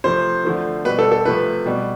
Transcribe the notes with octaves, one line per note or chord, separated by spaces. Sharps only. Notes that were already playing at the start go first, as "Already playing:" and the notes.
C3 F3 A3 C5
D3 F3 A3
B2 G3 B4
A4
A4
C3 F3 A3 B4
B2 G3